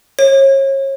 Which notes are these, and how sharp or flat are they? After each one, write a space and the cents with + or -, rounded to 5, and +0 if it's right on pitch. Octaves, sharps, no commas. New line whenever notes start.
C#5 -35